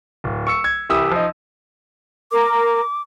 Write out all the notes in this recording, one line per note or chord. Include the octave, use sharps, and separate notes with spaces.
D1
C#6 E6 C#7
G#6
C2 E3 G4 D#6 E6
F3 D#4
A#4 D6